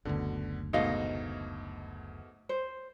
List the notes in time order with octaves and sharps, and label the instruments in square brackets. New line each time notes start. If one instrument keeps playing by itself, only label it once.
[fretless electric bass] F#1 D2 [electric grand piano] B2 D3
[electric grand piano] G#2 B2 A3 [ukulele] D#4 D#5 F5
[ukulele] C5